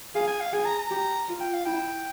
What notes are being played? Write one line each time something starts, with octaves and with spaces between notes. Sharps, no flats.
G#4 F5
G#5
F5
G#4 G#5
A#5
A#5
G4
F4
G5
F5
E4 G5